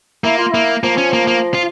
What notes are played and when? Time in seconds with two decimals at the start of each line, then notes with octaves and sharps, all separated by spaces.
0.24 A#3 E4
0.38 F4
0.52 A#3 E4
0.83 F3 A#3
0.98 C#4
1.13 A#3
1.27 A#3
1.54 F4